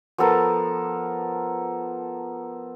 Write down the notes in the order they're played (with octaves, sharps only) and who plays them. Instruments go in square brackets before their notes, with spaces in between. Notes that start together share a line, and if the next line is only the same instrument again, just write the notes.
[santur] F3 B3 A4 A#4